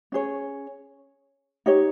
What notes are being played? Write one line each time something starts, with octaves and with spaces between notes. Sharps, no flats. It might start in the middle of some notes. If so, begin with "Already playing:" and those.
C#4 G#4 C#5
D#4 G4 C#5